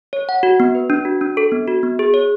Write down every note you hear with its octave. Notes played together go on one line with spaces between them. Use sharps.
C#5
F#5
F#4
B3
B4
D4
F#4
D4
A4
B3
F#4
B3
G#4
C#5